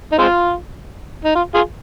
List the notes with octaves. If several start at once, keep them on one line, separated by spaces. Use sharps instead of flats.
D#4
G#3 C4 F4
D#4
F4
F4 G#4